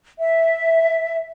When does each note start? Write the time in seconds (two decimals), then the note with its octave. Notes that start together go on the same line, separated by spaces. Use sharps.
0.19 E5